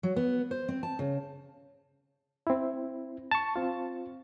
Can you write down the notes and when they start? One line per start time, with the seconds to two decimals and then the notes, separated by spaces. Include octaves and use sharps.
0.03 F#3
0.16 B3
0.51 C5
0.68 C4
0.83 A5
0.99 C#3
2.47 C4 E4
3.31 A5 C#6
3.56 C4 F4